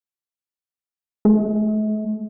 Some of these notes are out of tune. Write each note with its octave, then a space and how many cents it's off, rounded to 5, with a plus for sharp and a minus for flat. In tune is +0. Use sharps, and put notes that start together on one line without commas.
A3 -45